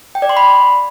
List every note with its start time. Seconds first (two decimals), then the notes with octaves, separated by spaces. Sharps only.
0.15 G5
0.22 D5
0.29 C6
0.37 B5